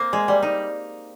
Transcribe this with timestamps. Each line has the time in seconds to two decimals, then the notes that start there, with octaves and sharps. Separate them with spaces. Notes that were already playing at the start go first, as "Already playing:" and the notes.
Already playing: A#3 C4
0.13 G#3
0.28 G3
0.43 D#4